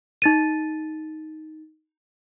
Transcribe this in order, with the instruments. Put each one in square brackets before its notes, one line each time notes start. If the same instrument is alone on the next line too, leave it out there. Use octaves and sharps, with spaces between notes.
[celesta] D#4 A6 D#7